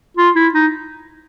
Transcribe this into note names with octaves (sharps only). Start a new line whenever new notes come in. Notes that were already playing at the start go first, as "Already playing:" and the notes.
F4
E4
D#4